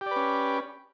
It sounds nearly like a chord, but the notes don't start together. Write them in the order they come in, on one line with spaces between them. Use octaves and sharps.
G4 D5 B4 C#4